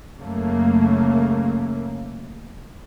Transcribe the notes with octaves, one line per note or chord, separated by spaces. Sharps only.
F#2 C#3 A3 A#3